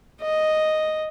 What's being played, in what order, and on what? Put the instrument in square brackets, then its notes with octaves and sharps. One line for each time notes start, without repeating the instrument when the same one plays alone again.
[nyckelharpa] D#5